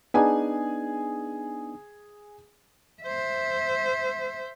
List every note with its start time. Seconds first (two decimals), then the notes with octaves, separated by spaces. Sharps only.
0.14 B3 D4 D#4 G#4 G#5
3.03 C5 E5